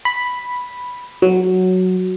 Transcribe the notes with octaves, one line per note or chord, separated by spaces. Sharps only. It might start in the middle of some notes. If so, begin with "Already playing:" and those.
B5
F#3